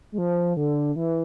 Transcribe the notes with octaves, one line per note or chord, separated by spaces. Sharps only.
G#3
F3
D3
E3